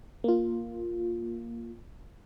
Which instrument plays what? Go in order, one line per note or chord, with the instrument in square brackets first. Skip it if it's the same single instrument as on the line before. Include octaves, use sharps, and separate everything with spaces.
[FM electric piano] A#3 F4